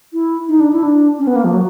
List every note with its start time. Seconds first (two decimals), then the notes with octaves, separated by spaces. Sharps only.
0.13 E4
0.49 D#4
0.60 D4
0.72 E4
0.83 D4
1.19 C#4
1.27 B3
1.36 A#3
1.44 F3
1.53 F#3